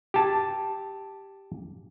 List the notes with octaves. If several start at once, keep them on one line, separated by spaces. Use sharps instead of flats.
G4 A5